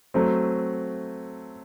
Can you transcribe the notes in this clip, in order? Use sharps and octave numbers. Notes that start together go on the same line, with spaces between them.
F#3 A3 C4